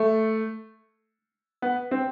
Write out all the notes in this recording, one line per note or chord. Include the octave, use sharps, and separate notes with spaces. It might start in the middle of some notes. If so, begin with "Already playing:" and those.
Already playing: A3
B3
C4